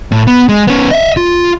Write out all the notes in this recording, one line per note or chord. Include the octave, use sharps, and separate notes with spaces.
A2
B3
G#3
B3 C#4
D#5 E5
F4